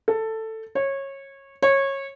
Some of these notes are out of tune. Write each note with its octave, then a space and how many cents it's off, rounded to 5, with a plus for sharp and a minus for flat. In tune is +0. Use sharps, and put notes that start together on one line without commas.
A4 +10
C#5 -20
C#5 -20